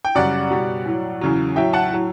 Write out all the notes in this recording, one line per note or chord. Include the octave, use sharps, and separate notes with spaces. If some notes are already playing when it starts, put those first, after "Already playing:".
G5
F#2 C#3 G3 D5 F#5
B2 G3
A2 F#3
E2 C#3 F#3
A2 F#3 E5 G5
F#5 A5
A2 F#3